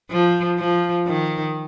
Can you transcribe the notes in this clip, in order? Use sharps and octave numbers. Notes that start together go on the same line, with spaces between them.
F3
F3
D#3